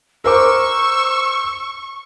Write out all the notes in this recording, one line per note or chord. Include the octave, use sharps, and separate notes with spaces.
A#4 C5 C#6 D6 E6